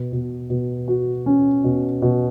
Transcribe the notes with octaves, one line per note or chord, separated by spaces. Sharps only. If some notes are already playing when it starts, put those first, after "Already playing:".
Already playing: B2
B2
B2
F#4
C#4
B2
B2